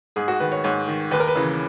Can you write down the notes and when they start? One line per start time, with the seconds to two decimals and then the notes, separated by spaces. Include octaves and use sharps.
0.16 G#2 G#4
0.28 F#4
0.40 D#3 B4
0.52 C#5
0.64 G#2 C#5
0.88 D#3
1.11 D#2 B4
1.20 A#4
1.28 B4
1.36 C#3 E3